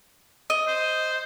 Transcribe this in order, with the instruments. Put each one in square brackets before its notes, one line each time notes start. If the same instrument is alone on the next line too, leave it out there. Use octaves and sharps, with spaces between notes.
[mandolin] D#5
[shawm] C5